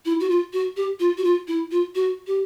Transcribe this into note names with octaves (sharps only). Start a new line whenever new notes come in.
E4
F#4
F4
F#4
G4
F4
F#4
F4
E4
F4
F#4
G4